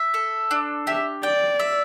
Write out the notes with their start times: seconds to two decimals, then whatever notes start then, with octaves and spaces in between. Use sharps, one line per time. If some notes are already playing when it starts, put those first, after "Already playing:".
Already playing: E5
0.14 A4
0.51 D4
0.87 G4 E5
1.23 D5 G5
1.60 E5